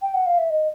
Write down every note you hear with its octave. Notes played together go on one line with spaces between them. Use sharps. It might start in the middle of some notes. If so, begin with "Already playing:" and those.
G5
F#5
F5
E5
D#5